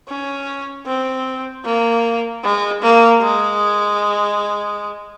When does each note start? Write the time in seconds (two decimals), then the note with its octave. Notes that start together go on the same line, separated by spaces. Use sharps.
0.08 C#4
0.87 C4
1.65 A#3
2.44 G#3
2.82 A#3
3.22 G#3